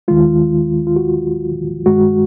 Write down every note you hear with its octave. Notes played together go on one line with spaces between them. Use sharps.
D#2 D#3 G#3 F4
F4
F#4
G2 D#3 G#3 F#4